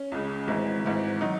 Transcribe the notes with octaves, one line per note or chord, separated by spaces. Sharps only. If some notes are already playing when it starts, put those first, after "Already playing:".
Already playing: C#4
C#2 C#3 G#3
G#1 G#2 E3 G#3
G#1 G#2 E3
D#3 F#3 D#4